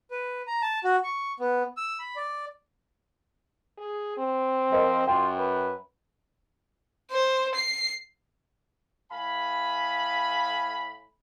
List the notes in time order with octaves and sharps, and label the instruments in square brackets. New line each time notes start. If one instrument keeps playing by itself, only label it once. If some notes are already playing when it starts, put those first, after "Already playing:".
[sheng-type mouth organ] B4
A#5
A5
F#4
C#6
B3
E6
B5
D5
[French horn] G#4
C4
[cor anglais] F3 [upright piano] A#4 C5 D#5
[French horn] F#2 [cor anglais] F4 [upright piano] G5
[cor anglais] B4
[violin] C5
C7
[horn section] A2 F5 G#5 B5